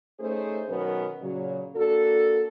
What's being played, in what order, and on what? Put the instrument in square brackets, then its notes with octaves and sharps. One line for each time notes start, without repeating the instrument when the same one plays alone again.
[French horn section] A3 C#4 D#4 G#4 C5
B2 D#3 F#3 B3 C#4 A#4
A#2 C#3 F#3
A#3 D4 F#4 A4